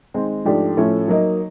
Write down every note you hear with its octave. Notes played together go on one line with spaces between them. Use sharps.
D#3 G#3 C4
G#2 F3 A3 D4 G4
A2 F3 A3 C#4
F#3 A#3 D#4